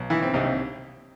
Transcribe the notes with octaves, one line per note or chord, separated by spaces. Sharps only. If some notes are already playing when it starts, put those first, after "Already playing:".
Already playing: B1
D#3 E3 E4
C4
C2 D#4
C4